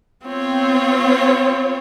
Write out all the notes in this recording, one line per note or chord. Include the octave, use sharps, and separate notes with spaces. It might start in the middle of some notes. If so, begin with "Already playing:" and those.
B3 C4 F4 C#5